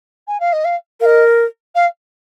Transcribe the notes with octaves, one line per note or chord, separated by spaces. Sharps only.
G#5
F5
D#5
F5
A#4 D#5 F5
F5